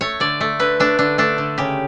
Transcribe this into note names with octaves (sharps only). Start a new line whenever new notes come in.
A3 C#5
D3 D5
A3
D3 B4
A3 D4
D3 D4
A3 D4
D3
C#3 G4